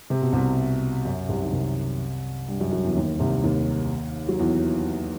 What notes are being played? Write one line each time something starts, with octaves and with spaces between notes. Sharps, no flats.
C3
B2
C2 C3
F#2
C2 C3
D#3
C2 C3
G2 G3
F#2 F#3
F#2 F#3
E2 E3
D#2 D#3
C2 C3
D#2 D#3
F#3
E2 E3